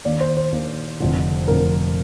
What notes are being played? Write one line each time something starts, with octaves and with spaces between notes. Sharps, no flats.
D#2 D#3 A#3 D4 D5
C5
C5
D#2 D#3 A#3 D4
F1 F2 D3
F1 F2 D3 A#4